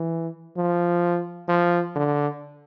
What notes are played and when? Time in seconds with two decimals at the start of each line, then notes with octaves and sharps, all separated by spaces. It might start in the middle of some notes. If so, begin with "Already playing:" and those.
Already playing: E3
0.57 F3
1.48 F3
1.95 D3